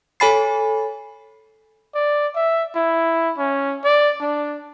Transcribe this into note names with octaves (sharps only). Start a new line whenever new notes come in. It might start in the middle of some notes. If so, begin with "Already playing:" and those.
A4 C#5 G#5 B5 A6 C7
D5
E5
E4
C#4
D5
D4